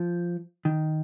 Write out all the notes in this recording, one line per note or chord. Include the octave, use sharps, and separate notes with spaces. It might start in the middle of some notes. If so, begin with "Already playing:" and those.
Already playing: F3
D#3